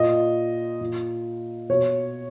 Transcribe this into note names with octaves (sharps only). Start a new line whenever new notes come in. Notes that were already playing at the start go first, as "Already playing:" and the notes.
Already playing: A#2 D#5
A#2
B2 C#5